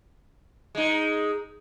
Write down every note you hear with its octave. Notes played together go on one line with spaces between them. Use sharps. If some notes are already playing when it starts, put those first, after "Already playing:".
G#3 D#4